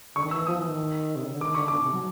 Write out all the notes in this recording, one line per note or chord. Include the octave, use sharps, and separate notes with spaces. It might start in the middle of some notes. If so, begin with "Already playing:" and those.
D3 C#6
D#3
E3 E6
F3 D#6
E3
D#3
C3
C#3
D3
D#3 D6
D3 C#6
D3 D6
C3
F#3